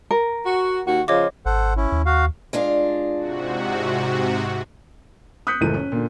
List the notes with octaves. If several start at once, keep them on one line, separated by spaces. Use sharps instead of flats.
A#4
F#4
D#2 F#4
C#3 F3 F4 C#5 D#5 D6
G#1 A4 C5 F#5
C#4 E4
D#2
F#4 F5
G#3 D4 F4
G#2 C3 F#4
D#6 F#6 G6 B6 C#7
F#1 C#2 A2 E3 A#4 D#7
C#4
A#2 D3